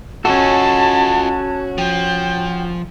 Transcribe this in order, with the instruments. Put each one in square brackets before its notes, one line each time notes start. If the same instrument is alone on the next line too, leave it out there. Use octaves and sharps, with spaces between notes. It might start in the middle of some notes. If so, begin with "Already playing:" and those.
[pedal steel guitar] C#4 A4 [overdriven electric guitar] F4 D#5 [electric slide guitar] F#4 [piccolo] A5
[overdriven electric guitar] F3 [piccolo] G5